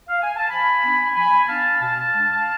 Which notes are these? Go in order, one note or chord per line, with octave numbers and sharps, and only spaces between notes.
F5
G#5
A5
F3 G#5 B5
B3 D4
F3 G#5 B5
B3 D4 F5 A5
B2 F5 A5
G#3 D4